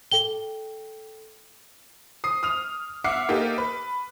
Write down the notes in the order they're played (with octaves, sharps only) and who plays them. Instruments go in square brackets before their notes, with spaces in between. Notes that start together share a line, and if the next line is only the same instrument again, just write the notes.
[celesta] A4 G5 G7
[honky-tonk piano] D#6 C7
D#6 F6 F7
E5 F#5 D6 F6 C7 C#7
A#3 D#4 G4 A4
B4